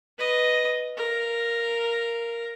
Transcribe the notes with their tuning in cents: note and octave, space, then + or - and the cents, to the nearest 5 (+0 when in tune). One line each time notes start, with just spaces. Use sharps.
B4 +0 D#5 +0
A#4 +0 F5 -15